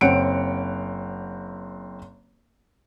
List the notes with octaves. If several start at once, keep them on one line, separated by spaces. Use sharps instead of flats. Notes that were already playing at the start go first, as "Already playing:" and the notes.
F#1 C4 C#5 F#5 C#7 D7